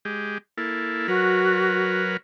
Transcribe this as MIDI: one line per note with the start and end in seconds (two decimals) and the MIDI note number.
0.05 0.38 56
0.05 0.38 67
0.58 1.07 58
0.58 1.07 64
0.58 1.07 69
1.08 2.17 54
1.08 2.01 66
1.08 2.17 70
1.08 2.17 71